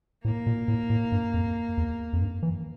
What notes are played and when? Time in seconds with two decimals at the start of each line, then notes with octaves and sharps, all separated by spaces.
0.25 A2 A#3
0.47 A#2
0.68 A2
0.90 A2
1.12 G2
1.34 F2
1.78 E2
2.13 F2
2.21 G2
2.43 E3